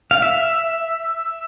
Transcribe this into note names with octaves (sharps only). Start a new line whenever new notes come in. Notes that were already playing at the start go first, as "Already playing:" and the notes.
F5
E5